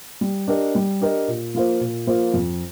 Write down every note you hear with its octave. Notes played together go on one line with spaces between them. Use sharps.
G3
D4 G4 A#4 D#5
G3
D4 G4 A#4 D#5
A#2
F3 A#3 F4 C5
A#2
F3 A#3 F4 C5
F2